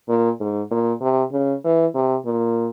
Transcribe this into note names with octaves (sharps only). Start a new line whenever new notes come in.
A#2
G#2
A#2
C3
C#3
E3
C3
A#2